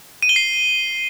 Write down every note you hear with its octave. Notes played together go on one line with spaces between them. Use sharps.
D#7
G7
C7